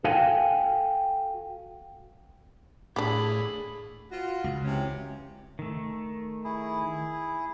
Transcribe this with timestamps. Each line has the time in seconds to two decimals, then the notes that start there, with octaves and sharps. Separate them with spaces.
0.04 F#4 A4 F5 G5 G#5
2.96 A2 D4 G4 G#4 B5
4.12 F4 F#4
4.44 C#2
4.64 C3 E3 C#4
5.59 D#3 A3
6.44 E4 G#4